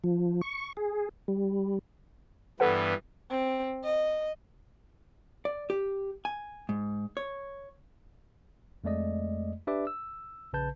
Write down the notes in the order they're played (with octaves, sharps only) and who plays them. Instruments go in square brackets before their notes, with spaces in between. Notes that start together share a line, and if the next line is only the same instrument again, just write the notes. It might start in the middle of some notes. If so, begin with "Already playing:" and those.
[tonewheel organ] F3
C#6
G#4
G3
[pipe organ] G2 E3 B3 [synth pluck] A4 B4 F#5
[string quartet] C4
D#5
[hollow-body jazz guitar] D5
G4
G#5
G#2
C#5
[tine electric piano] F2 G#3 A3 D5 D#5
D4 G4 B4 D5 E5 D6
E6
A#1 C#3 B4 A5 G6